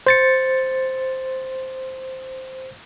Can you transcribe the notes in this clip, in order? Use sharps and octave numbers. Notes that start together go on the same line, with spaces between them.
C5 A6 C#7